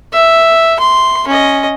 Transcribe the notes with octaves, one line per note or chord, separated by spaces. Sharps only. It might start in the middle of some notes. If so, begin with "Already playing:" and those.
E5
C6
C#4 D#5